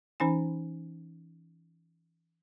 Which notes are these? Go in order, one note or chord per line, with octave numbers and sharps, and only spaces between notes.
E3 C#4 D#4 G#5